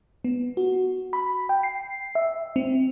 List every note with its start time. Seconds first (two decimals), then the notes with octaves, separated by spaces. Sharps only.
0.24 B3
0.57 F#4
1.13 B5
1.49 G5
1.63 C7
2.15 E5
2.56 C4